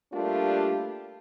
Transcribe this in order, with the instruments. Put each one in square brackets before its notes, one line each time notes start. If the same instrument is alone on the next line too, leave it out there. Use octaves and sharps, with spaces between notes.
[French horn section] G3 A3 A#3 D4 F4 G4